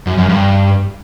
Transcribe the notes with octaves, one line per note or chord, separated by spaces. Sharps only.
F#2
F#2
G2